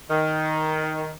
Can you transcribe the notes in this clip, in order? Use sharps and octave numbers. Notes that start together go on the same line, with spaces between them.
D#3